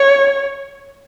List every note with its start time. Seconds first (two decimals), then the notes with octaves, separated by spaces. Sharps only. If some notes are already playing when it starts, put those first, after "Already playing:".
Already playing: C#5